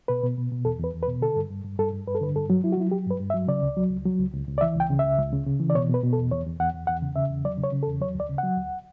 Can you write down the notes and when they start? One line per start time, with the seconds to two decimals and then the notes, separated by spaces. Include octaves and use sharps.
0.08 B2 B4
0.23 B2
0.38 B2
0.52 B2
0.65 E2 A4
0.79 E2 B4
0.94 E2
1.03 B4
1.08 B2
1.21 D3 A4
1.36 G2
1.50 G2
1.64 G2
1.79 G2 A4
1.93 G2
2.08 G2 B4
2.15 A4
2.21 D3 B4
2.36 G2 A4
2.50 F#3
2.64 F#3 E4
2.72 F#4
2.78 F#3 E4
2.91 F#3 G4
3.07 G2
3.11 B4
3.19 G2
3.30 E5
3.34 F#3
3.48 C#3 D5
3.63 C#2
3.77 F#3
3.91 C#2
4.06 F#3
4.19 C#2
4.34 C#2
4.47 C#2
4.58 D5
4.61 E3 E5
4.76 C#2 G5
4.90 C#3
4.99 C#2 E5
5.18 C#2
5.33 C#3
5.47 C#3
5.60 E3
5.70 D5
5.75 B2 C#5
5.89 B2 B4
6.03 B2
6.13 A4
6.17 E2
6.31 E2 C#5
6.46 E2
6.59 E2 F#5
6.74 E2
6.87 E2 F#5
7.03 C#3
7.16 C#3 E5
7.30 E2
7.44 F#3 D5
7.58 C#3
7.64 C#5
7.72 C#3
7.83 A4
7.87 E2
8.00 F#3 C#5
8.15 D2 D5
8.29 C#3
8.38 F#3 F#5
8.57 D2